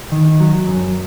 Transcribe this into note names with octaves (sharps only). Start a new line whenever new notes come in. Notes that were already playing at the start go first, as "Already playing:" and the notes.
D#3
F#3
F#2